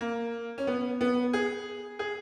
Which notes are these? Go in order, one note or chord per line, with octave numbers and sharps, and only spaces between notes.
A#3
C#4
B3
B3
G#4
G#4